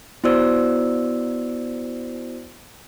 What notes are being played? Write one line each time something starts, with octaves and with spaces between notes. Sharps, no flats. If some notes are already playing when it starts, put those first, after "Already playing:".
B3 E4 F#4 C5 D5 E6